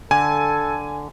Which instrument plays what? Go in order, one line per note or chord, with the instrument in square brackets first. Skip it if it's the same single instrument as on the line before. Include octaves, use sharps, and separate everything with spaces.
[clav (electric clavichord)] D3 [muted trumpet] A4 [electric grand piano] G#5